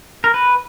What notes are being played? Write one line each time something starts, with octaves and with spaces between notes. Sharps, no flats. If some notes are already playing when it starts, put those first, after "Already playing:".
A#4
B4